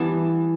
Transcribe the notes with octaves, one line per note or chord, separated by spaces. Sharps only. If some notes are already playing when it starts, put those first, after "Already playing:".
Already playing: E3 G3 B3 A5